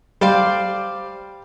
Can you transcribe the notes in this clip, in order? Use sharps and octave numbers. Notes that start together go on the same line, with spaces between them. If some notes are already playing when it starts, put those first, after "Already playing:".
G3 C5 D5 F5